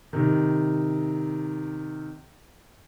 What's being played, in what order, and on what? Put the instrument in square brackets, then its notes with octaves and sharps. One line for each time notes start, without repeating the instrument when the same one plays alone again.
[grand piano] C3 D#3